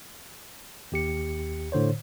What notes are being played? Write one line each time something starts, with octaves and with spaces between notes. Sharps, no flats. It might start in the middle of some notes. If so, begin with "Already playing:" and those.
D#2 G4 C#7
A2 D3 C5 C#5